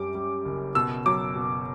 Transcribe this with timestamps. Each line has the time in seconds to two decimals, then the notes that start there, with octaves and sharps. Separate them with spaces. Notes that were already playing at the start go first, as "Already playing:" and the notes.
Already playing: F#2 G3 D6
0.15 G3
0.45 F#1
0.75 B2 E6
1.06 F#3 D6
1.36 B2